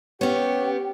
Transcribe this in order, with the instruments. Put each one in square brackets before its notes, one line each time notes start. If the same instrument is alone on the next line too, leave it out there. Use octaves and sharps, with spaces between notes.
[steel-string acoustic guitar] B3 C#4 [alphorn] G4 [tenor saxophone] C#5 [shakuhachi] G5